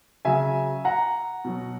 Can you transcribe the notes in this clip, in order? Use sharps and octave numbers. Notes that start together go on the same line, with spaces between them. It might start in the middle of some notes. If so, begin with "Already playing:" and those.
C#3 F#3 E5 G#5
F#5 A#5
B2 F#3